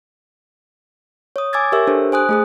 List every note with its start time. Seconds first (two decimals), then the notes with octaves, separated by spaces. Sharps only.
1.36 C#5 D#6
1.53 G#5 D6 E6 G#6 A6
1.72 G4 A#4 C#5 E5 E6
1.87 D4 G4 A4 C5
2.12 C5 G#5 D#6 F#6
2.29 A3 G#4 D#6